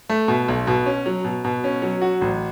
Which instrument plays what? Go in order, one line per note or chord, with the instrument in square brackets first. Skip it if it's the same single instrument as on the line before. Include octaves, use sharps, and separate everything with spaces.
[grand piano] A3
B2
B1
B2
C#4
F#3
B2
B2
C#4
F#3
F#4
A1